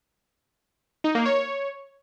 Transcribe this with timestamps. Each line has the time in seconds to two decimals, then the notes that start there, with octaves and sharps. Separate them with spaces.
1.04 D#4
1.15 A#3
1.25 C#5